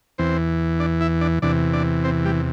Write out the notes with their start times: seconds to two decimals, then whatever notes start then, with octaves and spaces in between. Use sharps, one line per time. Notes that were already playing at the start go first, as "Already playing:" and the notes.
0.18 E2 E3 C4 C5
0.80 D4 D5
1.01 E4 E5
1.21 D4 D5
1.42 E2 C3 E3 D4 D5
1.73 D4 D5
2.04 C4 C5
2.24 G3 G4